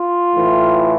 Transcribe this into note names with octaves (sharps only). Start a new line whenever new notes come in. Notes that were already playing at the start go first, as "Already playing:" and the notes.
Already playing: F4
A2 E3